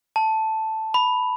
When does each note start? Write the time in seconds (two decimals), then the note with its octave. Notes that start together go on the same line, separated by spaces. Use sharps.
0.16 A5
0.94 B5